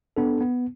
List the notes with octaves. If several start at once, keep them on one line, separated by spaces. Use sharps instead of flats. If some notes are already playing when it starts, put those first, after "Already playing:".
B3 D4 A4
B3